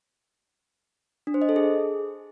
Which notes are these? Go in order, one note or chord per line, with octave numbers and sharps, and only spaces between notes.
D4
C5
D#5
A4
G#4